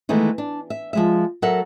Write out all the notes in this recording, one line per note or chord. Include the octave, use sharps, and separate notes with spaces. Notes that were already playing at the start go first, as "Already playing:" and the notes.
D#3 E3 G#3 A3 B3
D4
E5
F3 G#3 E5
F#3 A4 A#4 E5 F#5